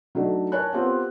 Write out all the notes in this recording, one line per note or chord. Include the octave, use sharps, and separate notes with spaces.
F#3 A3 D4 D#4
A#4 C#5 G#5 A5 F#6
B3 C4 F4 G4 A#4 F#5